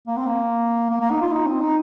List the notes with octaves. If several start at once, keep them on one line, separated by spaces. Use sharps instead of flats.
A#3
C4
A#3
A#3
A#3
D#4
F4
D#4
C4
D#4